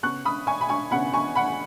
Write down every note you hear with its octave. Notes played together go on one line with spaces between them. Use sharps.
C#3 B3 C#6 F#6
B5 D#6
G#5 C#6
B5
G#5 C#6
C#3 B3 F#5 B5
G#5 C#6
F#5 B5